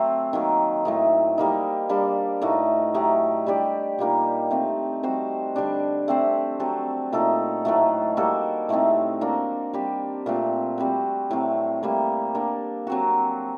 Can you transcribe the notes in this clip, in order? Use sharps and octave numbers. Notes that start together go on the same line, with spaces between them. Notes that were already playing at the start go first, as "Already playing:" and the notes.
Already playing: F#3 A3 C4
D#3 F#3 A#3
A2 A3 D#4
G3 A#3 D#4
G3 A#3 D4
A2 A3 D#4 F#4
F#3 A3 D#4 G4
G3 D4 G4 D5
A#2 G3 A#3 D#4
A3 C4 D#4
G3 C4 F#4 C5
D3 G3 D4
A3 C4 G4 C5
F#3 C4 F#4 A4
A#2 A3 D#4 A4
A2 F#3 A3
G3 A#3 F#4 A4
A2 A3 C4 D#4
A#3 D4 F#4
G3 C4 G4
A#2 A3 C4
G3 C4 F#4
A2 F#3 C4
A2 G3 A#3
A#3 D4 A4
F#3 C4 F#4